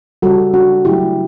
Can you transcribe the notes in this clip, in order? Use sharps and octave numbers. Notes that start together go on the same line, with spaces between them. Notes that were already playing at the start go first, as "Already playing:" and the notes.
C#3 G3 F#4 A4
D4 F#4
C#3 F#3 A3 E4 G4